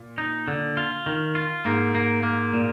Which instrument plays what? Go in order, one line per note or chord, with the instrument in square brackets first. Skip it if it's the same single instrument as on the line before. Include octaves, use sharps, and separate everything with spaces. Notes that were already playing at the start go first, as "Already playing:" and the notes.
Already playing: [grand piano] A#2
[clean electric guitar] D#4
D3
F4
D#3
F4
[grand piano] G#2 [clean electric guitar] A#3
[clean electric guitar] A#3
A#3
A#2